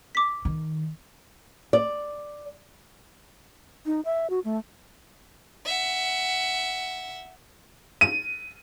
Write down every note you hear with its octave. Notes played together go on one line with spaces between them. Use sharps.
D6 B6
D#3
D5
D#4
E5
F#4
A3
E5 F#5
D#7